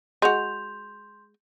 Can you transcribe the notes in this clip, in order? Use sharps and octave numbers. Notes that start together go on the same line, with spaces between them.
G#3 F#4 C6 G6 F7